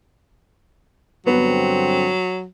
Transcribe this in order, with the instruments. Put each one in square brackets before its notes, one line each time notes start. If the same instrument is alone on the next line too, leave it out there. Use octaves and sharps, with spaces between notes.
[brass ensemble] G2 D3 C4 [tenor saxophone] F#3 [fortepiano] B3